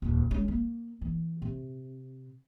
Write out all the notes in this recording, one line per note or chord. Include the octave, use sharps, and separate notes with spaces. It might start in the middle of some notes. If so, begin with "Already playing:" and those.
D#1 C#2
G#3 C#4
A#3
E3
C3